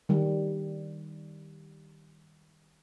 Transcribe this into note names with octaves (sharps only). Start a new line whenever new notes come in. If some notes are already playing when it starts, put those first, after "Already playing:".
D#3 G3